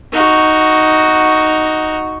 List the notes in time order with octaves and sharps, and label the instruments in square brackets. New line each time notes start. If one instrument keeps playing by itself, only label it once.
[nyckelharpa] D#4 F#4